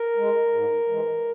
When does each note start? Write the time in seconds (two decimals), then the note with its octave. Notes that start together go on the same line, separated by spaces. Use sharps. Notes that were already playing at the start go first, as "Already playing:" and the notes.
Already playing: A#4
0.17 G#3
0.52 G#2
0.88 E3 G#3